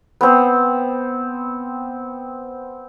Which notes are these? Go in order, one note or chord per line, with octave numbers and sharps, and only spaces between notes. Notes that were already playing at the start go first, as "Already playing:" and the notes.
B3 C4